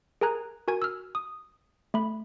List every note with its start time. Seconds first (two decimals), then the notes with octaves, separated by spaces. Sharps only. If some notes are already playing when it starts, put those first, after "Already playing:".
0.21 G#4 A#4 G#5 A#5 F#6 G#6
0.68 F#4 A#4 G#5 G#6
0.82 E6 F6
1.15 D#6
1.94 A3 B5